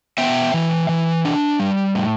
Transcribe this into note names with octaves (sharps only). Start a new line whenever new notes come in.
B3 E5 G5
E3
E3
D4
G3
A2